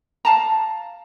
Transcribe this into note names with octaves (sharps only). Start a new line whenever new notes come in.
F5 A5 A#5